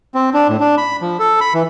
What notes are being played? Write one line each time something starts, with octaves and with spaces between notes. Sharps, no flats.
C4
D4
A2
D4
B5
F3
A4
B5
E3